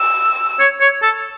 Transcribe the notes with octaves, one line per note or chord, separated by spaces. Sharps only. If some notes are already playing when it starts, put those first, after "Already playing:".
Already playing: E6
C#5
C#5
A4